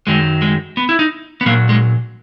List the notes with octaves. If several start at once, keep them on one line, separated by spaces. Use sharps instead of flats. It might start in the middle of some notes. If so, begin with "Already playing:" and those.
F#2 D#3 F#3 G#3
G#3
B3
E4
D#4
B3
A#2 F#3 A#3
G#3